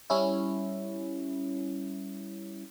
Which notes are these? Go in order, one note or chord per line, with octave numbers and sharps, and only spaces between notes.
G3 C#4 E4